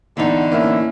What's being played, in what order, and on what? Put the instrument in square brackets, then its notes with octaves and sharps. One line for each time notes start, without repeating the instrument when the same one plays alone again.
[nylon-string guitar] E2 D#4 [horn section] A2 D3
[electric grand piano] A#3 C#4 [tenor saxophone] E4